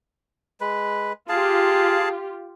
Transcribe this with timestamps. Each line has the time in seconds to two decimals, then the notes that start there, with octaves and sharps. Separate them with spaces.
0.61 G#3 B4
1.29 F4 G4 G#4 F5 A5